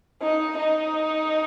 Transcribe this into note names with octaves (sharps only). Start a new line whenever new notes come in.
D#4
D#4